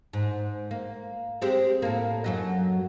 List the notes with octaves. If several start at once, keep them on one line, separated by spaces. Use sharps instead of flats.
G#2
A#3
G#3 C4 G4
A2 A#3
F#2 F#3 D#5